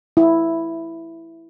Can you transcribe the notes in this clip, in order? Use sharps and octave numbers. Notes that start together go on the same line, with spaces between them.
E4